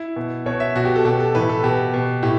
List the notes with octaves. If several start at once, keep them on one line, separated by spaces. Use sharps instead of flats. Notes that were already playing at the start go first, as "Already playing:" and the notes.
Already playing: E4
B2
B2 C#5
E5
B2 F#4
G4
A4
B2 G4
A4
A2 E3 B4
A4
B2 G4
B2
A2 G4